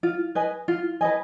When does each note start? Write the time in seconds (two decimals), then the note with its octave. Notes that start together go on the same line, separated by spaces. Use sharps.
0.03 F4
0.35 B4 D#5 G#5
0.68 F4
1.01 B4 D#5 G#5